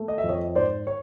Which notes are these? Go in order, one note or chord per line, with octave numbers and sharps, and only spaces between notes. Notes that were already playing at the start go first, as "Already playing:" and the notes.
Already playing: A3
D#5
E5
F2
C#5 D#5
G#2 C5 D5
C#5